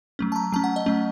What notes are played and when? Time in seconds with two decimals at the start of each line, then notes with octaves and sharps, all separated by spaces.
0.19 F#3 A3 C#4
0.32 A5
0.36 A#5
0.52 F#3 A3 C#4 A5
0.64 F#5
0.76 D#5
0.86 F#3 A3 C#4